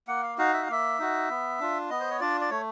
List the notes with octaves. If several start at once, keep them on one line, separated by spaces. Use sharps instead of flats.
A#3 F#5
F5
D#4 F#4 F5
E5
F5
A#3 E5
D#4 F#4
B3
D4 F4
B3 D#5
C5
C#5
D4 F4 D5
D5
A3 C#5